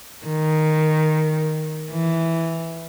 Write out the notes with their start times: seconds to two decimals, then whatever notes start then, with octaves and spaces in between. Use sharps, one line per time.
0.26 D#3
1.91 E3